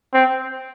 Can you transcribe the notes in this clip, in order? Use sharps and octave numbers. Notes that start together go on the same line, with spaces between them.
C4